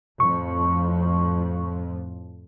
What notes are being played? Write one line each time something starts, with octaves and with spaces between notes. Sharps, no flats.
F2 A2 F3 C#6